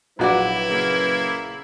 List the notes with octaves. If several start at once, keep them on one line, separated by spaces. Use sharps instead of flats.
A#1 F#3 E4 F#4 B4 D5
C#3 A#3